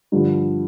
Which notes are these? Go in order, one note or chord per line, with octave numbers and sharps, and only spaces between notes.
G2 D3 F3